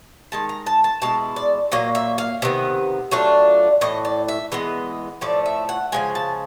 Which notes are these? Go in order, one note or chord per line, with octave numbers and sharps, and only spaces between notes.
D#3 G#3 A5
A#5
A5
A5
B2 G#3 E4 A5
D5
A#2 F#3 A#3 D#5
E5
F5
C3 D#3 B3
F#3 A3 D4 F4
A2 E3 D#5
D5
E5
E3 G#3 B3 D#5
A2 F3 A3 D5
E5
F#5
C#3 F3 G#3 G#5
A5